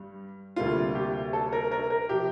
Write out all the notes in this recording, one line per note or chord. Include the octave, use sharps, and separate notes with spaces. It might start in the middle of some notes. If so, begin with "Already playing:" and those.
Already playing: G2 G3
D2 C3 G3 A#3 D4 F4
G4
A4
A#4
A#4
A#4
C3 F3 G4